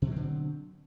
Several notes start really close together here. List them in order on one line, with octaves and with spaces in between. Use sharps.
B2 F#3 C4 D3